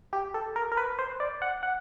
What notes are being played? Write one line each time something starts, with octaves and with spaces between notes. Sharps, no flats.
G4
A4
A#4
A#4
B4
C5
D5
F#5
F#5